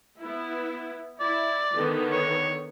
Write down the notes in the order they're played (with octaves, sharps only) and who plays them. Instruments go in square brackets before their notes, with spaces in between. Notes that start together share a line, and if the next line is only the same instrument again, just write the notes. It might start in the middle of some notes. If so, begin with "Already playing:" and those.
[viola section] B3 E4
[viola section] E4 [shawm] D5
[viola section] D3 D#3 B3
[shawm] C#5